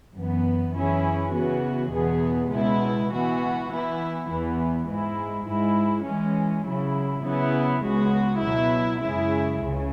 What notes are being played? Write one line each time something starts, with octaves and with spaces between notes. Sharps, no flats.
F#2 E3 B3
F#2 E3 C#4 E4 G#4
C#3 E3 B3 F#4
E2 B2 B3 G#4
C#2 B2 G#3 B3 E4
E3 B3 F#4
E3 B3 E4
E2 E3 B3
G#2 G#3 E4
G#2 G#3 E4
E3 G#3 C#4
C#3 F#3 E4
C#3 F#3 B3 E4
C#2 C#3 G#3 B3 F#4
B2 F#3 E4
F#2 C#3 G#3 E4 G#4
C#2 C#3